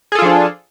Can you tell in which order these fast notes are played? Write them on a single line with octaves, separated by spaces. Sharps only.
G#4 A4 F4 F3 D4